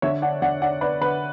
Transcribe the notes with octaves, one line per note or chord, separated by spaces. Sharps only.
D3 C#5 E5
D4 D5 F#5
D3 D5 F#5
D4 D5 F#5
D4 B4 D5
D3 B4